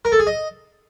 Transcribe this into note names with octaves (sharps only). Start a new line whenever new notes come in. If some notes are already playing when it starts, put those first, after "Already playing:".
A#4
A4
G#4
D#5